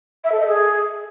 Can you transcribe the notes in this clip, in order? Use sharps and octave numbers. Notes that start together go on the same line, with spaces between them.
E5
A4
D#5
G#4